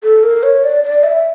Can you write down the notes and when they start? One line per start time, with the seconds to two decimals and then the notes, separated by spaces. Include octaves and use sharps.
0.03 A4
0.23 A#4
0.43 C#5
0.64 D5
0.84 D5
1.04 E5